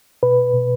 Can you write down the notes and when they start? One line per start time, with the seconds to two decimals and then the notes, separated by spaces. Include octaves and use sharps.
0.23 B2 B4
0.54 B2